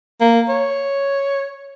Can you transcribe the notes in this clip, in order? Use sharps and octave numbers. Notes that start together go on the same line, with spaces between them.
A#3
C#5